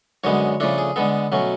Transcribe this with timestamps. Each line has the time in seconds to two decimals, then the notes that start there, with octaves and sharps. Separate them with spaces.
0.24 F#2 D3 G#3 B3 C#5
0.60 C#3 F3 A3 D4 A4
0.78 G#4
0.96 D3 G#3 B3 A4
1.32 B2 F#3 A3 C#4